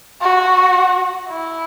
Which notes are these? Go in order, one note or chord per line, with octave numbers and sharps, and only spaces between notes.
F#4
E4